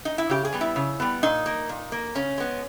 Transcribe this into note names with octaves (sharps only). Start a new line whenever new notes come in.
D#4
E4
C#3 G4
G#4
G3 B3
E4
C#3
G3 B3
A#2 D#4
A#3
A#2
A#3
C#3 C#4
G#3 B3